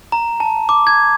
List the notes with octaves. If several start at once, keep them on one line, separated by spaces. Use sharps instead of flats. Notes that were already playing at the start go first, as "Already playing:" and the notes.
A#5
A5
D6
G#6